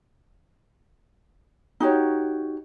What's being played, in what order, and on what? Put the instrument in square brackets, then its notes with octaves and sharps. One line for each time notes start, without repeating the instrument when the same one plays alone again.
[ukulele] D#4 F#4 G4 C#5